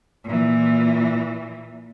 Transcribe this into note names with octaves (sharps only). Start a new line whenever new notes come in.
A#2 E3